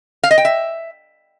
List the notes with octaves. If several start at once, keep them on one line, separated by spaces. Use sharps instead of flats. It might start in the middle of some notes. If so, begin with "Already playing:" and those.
F5
D#5
G5
E5